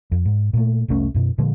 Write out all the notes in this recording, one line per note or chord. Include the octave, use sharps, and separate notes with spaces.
F2
G#2
A#2 A3
F1 C2 A3 C#4
F#2 B2
A#2 D3 F3 G#3